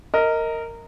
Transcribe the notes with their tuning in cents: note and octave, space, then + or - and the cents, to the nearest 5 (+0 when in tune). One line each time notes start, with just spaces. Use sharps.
A#4 -15 D#5 +15